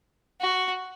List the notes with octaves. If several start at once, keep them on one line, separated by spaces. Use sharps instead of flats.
F#4